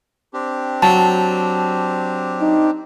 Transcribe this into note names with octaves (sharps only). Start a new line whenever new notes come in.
C4 D4 G4
F#3 A5
D#4